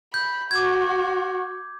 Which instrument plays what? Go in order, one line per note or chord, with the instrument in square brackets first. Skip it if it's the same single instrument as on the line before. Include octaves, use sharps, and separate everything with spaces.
[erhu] B5 [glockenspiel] G6
[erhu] F#4 [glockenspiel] D6 G#6